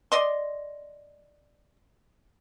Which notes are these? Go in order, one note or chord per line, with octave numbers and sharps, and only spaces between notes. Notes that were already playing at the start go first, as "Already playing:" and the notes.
D5 D#5 C6